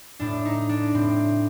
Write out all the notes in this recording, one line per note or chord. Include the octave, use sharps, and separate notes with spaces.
A2 D4
D#4
D4
A2 C4